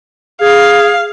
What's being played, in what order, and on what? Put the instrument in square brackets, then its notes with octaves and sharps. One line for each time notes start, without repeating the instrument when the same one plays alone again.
[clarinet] G#4 [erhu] F5